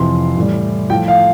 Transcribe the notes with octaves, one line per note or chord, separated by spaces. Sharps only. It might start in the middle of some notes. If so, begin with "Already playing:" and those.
Already playing: F2 C3 E3 C6
A2 E3 G3
A2 F3 G5
F5